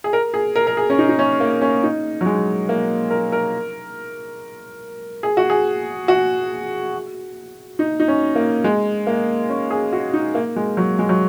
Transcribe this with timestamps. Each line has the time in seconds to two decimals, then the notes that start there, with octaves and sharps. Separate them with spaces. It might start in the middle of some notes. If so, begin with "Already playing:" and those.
0.04 G#4
0.13 A#4
0.34 G#4
0.56 A#4
0.67 A#4
0.77 G#4
0.90 C#4
0.99 D#4
1.09 D#4
1.19 C#4
1.40 A#3
1.61 C#4
1.83 D#4
2.21 F#3
2.26 G#3
2.69 A#3
3.10 A#4
3.32 A#4
5.23 G#4
5.37 F#4
5.50 G#4
6.08 F#4
7.79 D#4
8.00 D#4
8.08 C#4
8.35 A#3
8.64 G#3
9.07 A#3
9.49 C#4
9.71 G#4
9.93 F#4
10.14 D#4
10.35 A#3
10.56 G#3
10.77 F#3
10.99 G#3
11.09 F#3